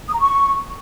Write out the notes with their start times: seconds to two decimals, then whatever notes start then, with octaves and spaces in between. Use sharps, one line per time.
0.08 D#6
0.14 A#5
0.19 C#6